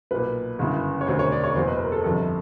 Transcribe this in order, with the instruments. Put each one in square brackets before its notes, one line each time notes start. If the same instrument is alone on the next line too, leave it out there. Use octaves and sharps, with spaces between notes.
[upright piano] B1 A#2 B4
G1 F#2 C#3 E3
C#5
E1 D2 C3 C5
C#5
D5
C#5
F#1 E2 B2 C5
B4
A#4
A4
G1 F2 C3 A4